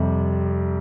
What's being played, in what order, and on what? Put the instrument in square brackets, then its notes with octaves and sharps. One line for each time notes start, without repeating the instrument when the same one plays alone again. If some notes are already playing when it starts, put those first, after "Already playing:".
Already playing: [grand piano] F2 C3 G3